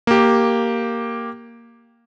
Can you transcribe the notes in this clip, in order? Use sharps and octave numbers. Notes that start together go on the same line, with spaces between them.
A#3 G4